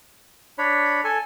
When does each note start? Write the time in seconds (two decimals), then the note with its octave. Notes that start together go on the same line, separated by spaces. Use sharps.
0.58 D4 C#5 B5
1.04 A4 G#5